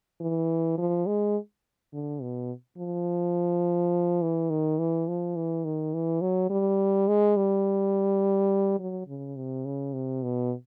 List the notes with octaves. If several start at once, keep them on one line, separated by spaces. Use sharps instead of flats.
E3
F3
G#3
D3
B2
F3
E3
D#3
E3
F3
E3
D#3
E3
F#3
G3
G#3
G3
F#3
C#3
C3
C#3
C3
B2